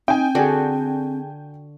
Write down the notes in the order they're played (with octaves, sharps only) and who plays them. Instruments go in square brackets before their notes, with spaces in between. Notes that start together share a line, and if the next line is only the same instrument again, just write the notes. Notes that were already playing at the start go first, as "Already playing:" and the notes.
[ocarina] C4 [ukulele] D#4 [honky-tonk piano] G5 G#5
[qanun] D3 F#4 [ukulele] G#4 A4 D5